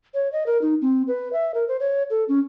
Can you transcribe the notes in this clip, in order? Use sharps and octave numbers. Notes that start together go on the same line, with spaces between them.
C#5
D#5
A#4
D#4
C4
B4
E5
A#4
C5
C#5
A4
C#4